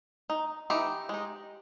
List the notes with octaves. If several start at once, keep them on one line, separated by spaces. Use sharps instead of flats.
D#4
E3 D#4 G4
G#3 D#4